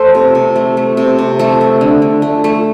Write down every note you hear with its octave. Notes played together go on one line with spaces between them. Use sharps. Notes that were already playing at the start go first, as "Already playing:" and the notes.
Already playing: A3 A4 C5
C3
C3
A3
A3
C3
C3
A3 A4
A3
D3
D3
A3
A3